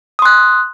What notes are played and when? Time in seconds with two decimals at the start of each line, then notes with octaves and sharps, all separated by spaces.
0.19 D#6
0.22 C6
0.25 F#6